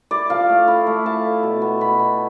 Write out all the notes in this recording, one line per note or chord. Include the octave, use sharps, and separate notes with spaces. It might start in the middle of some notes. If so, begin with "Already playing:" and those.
E4 D5
F3 F5
A3
E4
A3
F3 A5
E4
B2
B3
B2 B5
B2